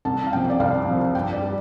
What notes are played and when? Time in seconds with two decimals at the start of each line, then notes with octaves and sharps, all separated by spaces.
0.05 C2 A5
0.27 F5
0.33 C3 F3 G5
0.50 D5
0.60 C2 F5
0.87 C3 F3
1.15 G2 G5
1.33 D5
1.42 G3